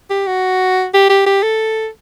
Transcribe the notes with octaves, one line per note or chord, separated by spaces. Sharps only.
G4
F#4
G4
G4
G4
A4